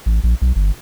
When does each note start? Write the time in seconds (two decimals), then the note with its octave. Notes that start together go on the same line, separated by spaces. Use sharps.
0.06 A1
0.24 A#1
0.42 B1
0.56 G1